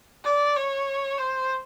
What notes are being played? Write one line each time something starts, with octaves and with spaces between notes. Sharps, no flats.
D5
C#5
C5